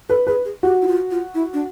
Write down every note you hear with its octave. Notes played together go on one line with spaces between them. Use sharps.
A4 B4
G#4 B4
G#4
F#4 G4
E4
F4
F4
E4
D4